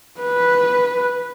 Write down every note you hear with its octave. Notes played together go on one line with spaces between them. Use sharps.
B4